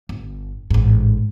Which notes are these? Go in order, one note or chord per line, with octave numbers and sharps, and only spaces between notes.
G1
A1 G#2